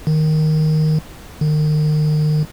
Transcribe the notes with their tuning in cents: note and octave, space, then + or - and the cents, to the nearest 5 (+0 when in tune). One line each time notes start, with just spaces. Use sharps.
D#3 +0
D#3 -35